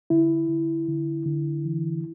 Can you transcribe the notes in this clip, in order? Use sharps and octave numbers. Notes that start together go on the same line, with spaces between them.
D3 E4
D3
D3
D3
E3